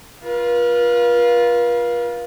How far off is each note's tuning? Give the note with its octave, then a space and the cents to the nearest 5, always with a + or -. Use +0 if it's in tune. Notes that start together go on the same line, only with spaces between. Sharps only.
F4 +0 B4 -40